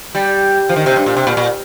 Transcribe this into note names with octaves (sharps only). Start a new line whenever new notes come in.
G3
F3
D#3
C3
G2
A#2
C3
A#2
A#2